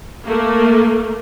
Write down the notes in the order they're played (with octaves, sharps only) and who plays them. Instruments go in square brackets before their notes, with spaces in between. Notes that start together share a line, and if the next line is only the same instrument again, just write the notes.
[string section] A3 A#3